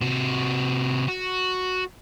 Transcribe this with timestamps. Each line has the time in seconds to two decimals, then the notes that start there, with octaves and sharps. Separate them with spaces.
0.01 C3 F#4
1.08 F#4